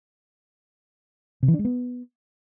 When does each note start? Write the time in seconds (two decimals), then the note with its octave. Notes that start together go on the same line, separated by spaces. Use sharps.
1.43 C3
1.48 E3
1.54 D4
1.59 G#3
1.65 B3